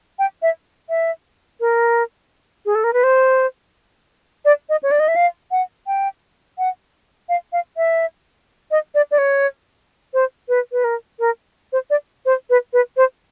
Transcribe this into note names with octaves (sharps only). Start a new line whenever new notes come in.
G5
E5
E5
A#4
G#4
A4
A#4
B4
C5
D5
D#5
C#5
D5
D#5
E5
F5
F#5
G5
F#5
F5
F5
E5
D#5
D5
D5
C#5
C5
B4
B4
A#4
A#4
C5
D5
C5
B4
B4
C5